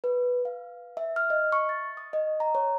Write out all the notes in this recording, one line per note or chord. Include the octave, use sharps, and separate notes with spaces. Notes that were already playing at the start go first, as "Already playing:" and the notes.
B4
F5
E5
F6
D#5
C#6
A6
D#6
D#5
A#5
C#5